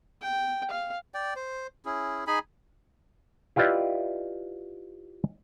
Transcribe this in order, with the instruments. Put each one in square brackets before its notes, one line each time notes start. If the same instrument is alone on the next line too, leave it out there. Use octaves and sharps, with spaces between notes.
[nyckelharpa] G5
F5
[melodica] D5 G5
C5
C#4 E4 G#4
D#4 G#4 G#5 B5
[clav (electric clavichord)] E4 F4 G4 B4 D5 D#5